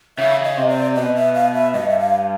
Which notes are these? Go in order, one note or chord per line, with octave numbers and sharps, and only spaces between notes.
C#3 E5
D#5
C3
D5
B2 D#5
E5
F5
E5
G2 D#5
E5
F5